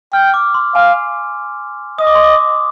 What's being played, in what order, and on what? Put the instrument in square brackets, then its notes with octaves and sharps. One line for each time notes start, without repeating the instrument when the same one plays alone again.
[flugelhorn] G5 [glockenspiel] F6
[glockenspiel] D6
C6
[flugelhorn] F5 [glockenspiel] G#5
[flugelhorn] D#5 [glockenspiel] D#6
[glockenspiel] D6
C6
D6